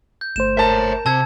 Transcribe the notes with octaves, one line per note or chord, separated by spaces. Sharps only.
G6
G1 A3 C5 E7
A#4 C#5 E5 A5
C3 A5 E6 G#6